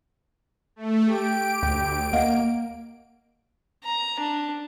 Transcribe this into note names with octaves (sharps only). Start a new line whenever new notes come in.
A3
G4 D7
D2
A#3 D#5 F5 F#5
A#5
D4